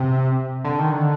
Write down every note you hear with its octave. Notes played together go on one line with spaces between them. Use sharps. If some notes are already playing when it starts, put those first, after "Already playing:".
Already playing: C3
D3
D#3
D3